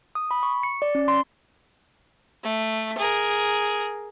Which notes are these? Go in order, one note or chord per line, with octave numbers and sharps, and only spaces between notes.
D#6
B5
C#6
C#7
D5
C#4
C6
A3
G#4 A#4